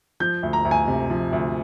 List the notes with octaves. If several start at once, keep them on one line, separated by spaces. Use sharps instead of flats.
F3 G6
D2
A#5
D2
G#5
C3
F3
D2